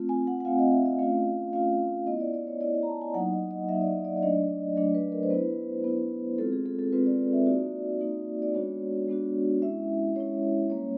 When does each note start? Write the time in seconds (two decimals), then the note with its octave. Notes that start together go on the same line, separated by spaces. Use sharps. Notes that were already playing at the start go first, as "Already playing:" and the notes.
Already playing: A3 C4 F4
0.09 G#5
0.27 F#5
0.40 F#5
0.45 A3 C4 F4 F5
0.59 D#5
0.72 E5
0.86 D#5
0.99 A3 C#4 F4 F5
1.53 A3 C#4 F4 F5
2.07 B3 E4 D#5
2.20 D5
2.34 D5
2.47 C#5
2.61 B3 E4 D5
2.74 D#5
2.83 A#5
2.88 A5
3.01 G#5
3.14 F#3 A#3 D#4 F#5
3.33 D#5
3.51 D#5
3.69 F#3 A#3 D#4 E5
3.81 D5
3.87 D#5
4.05 D5
4.17 D5
4.23 F#3 A3 D4 D#5
4.76 F#3 A3 D4 D#5
4.95 B4
5.12 A#4
5.23 C5
5.30 B3 E4 B4
5.84 B3 E4
6.38 G#3 C4 F4 A4
6.52 G#4
6.66 A4
6.79 A4
6.92 G#3 C4 F4 B4
7.06 D5
7.33 E5
7.46 A#3 D#4 F#4 D5
8.01 A#3 D#4 F#4
8.42 D5
8.54 G#3 B3 D4 F#4 C#5
9.08 G#3 B3 D4 F#4
9.62 G#3 C#4 E4 E5
10.16 G#3 C#4 E4 C#5
10.70 G3 A#3 C#4 C#5